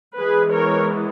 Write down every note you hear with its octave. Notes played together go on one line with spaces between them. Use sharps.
E3 G#3 B3 G#4 B4
A#4 C#5